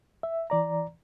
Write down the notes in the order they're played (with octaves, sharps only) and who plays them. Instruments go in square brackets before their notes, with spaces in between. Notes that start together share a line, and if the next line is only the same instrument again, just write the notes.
[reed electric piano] E5
E3 D5 A#5